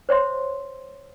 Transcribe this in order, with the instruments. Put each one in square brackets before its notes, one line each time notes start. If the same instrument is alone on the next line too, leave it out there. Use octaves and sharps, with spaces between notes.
[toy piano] C5 C#5 E5 C6